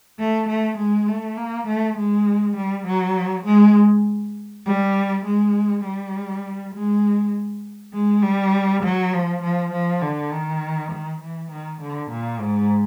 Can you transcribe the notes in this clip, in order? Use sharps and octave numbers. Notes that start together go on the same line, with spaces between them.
A3
A3
G#3
A3
A#3
A3
G#3
G3
F#3
G#3
G3
G#3
G3
G#3
G#3
G3
F#3
F3
F3
F3
D3
D#3
D#3
E3
D#3
D3
A#2
G#2